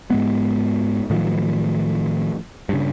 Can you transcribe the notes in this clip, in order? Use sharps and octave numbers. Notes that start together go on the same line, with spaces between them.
G#2 G#3 B3
A2 D#3 F3 F#3
G2 C#3